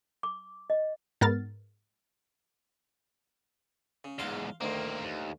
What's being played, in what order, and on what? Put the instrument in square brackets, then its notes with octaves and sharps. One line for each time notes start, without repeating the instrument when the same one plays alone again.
[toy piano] D6
D#5
[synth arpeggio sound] G#2 B3 A#4 F6 A6
[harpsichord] C#3
[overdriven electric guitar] E2 G#2 [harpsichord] F5 C6
[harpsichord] D2 D#3 [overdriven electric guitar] A#3 C4
[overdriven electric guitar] D#2